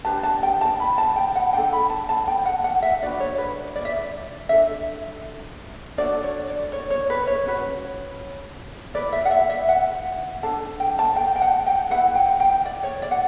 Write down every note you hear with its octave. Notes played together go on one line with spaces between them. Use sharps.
D4 G4 B4 A5
A5
G5
A5
B5
A5
G5
F#5
D4 A4 G5
B5
A5
A5
G5
F#5
F#5
E5
D4 F#4 B4 D5
C#5
B4
D5
E5
D5
D4 A4 E5
D4 F#4 A4 D5
C#5
D5
C#5
C#5
B4
C#5
C#4 F#4 B4
E4 B4 D5
E5
F#5
E5
E5
F#5
D4 A4 A5
G5
A5
G5
G5
F#5
G5
E4 B4 F#5
G5
G5
D5
C#5
D5
F#5